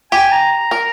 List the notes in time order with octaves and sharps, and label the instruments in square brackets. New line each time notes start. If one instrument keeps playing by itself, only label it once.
[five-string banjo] G4 [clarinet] G#5
[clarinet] A#5
A#5
[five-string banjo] A#4